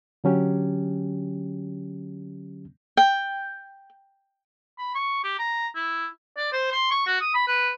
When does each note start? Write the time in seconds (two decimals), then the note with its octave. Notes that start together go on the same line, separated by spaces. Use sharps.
0.24 D3 F#3 C#4 G4
2.97 G5
4.78 B5
4.95 C#6
5.23 G4
5.39 A#5
5.75 E4
6.37 D5
6.53 C5
6.72 C6
6.91 C#6
7.07 F#4
7.21 D#6
7.34 B5
7.47 B4